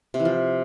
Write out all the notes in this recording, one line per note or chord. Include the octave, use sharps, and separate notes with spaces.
C3
E3
F3